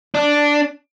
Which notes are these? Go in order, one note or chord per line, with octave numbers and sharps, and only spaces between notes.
D4